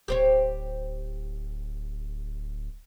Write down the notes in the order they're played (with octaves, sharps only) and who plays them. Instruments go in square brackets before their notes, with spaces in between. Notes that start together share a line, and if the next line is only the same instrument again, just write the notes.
[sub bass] D1 [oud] G4 C5 C#5